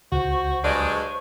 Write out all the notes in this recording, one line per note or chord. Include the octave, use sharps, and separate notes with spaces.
C#2 F#4 C5 C#6
G2 F#3 G#3 D5